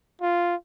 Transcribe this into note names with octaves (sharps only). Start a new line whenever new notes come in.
F4